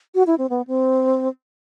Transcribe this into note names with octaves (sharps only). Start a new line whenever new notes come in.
F#4
E4
C4
B3
C4